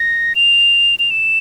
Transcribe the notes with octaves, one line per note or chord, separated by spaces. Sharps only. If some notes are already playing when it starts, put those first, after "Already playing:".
Already playing: A#6
F7
F7
E7